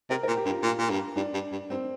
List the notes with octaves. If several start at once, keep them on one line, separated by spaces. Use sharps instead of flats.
C3 A#4
A#4
A#2
G4
G2
F4
A#2 F4
A#2
G2
G2 D4
G2
G2
G2 C4